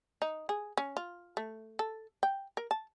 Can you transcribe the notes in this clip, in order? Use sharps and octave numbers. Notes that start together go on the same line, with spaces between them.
D#4
G#4
C#4
F4
A3
A4
G5
A#4
A5